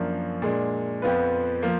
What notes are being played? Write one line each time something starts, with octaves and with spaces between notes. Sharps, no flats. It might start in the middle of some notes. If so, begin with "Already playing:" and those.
Already playing: F#2 F3 A#3 D4
A#2 G#3 D4
F2 F3 B3 F4 B4
F3 A#3